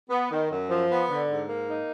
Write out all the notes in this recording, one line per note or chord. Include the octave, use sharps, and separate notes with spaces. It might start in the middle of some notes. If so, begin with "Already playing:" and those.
B3
D#3
F#2
F3
B3
D3
G#2
A#3
D#4